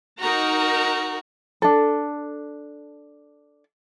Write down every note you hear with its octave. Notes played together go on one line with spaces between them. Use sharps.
D#4 F#4 A#4 A#5
D4 A4